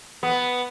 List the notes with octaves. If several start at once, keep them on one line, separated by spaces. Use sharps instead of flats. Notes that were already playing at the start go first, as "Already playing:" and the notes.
B3